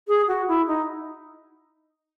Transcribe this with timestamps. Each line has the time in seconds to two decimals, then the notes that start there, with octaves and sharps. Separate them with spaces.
0.08 G#4
0.28 F#4
0.48 E4
0.68 D#4